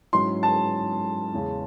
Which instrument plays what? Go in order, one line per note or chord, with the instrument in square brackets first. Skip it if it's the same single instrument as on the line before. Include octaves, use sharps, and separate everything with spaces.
[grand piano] G#2 F#3 C#4 E4 [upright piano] C6
[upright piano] A5
[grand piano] E2 C#3 G#3 C#4